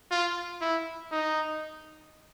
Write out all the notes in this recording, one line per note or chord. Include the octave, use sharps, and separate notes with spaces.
F4
E4
D#4